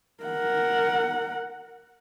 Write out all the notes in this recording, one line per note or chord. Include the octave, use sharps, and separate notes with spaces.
A#4 F#5